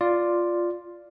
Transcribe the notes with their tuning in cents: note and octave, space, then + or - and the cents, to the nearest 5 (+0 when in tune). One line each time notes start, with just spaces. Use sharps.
F4 +0 D5 +0